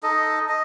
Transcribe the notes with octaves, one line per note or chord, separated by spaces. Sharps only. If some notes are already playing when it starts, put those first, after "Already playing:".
D#4 A4 D#5
D#5